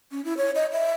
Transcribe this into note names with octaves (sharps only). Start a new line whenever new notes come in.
C#4
E4
C#5
D#5
E5